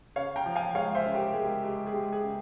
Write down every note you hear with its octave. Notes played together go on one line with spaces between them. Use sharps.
C#3 C#5 F5
G5 A#5
F3
F5 G#5
G#3 C#5 F5
C5 E5
C#3
G4 A#4
G#3 G#4
G#3 G4
G#4
G#3 G4
G#4
C#3